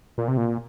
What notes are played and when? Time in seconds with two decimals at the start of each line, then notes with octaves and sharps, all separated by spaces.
0.18 A#2
0.28 C3
0.37 A#2